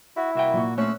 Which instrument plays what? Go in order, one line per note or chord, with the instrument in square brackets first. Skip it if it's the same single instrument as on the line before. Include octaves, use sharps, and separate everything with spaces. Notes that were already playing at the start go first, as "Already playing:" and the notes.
[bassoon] E4 [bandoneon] F#4
[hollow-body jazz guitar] C2 E5 G5 [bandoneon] A#3 F#4
[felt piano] A#2 C#6
[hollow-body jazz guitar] A3 C4 [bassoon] C#4 [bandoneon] E6 F#6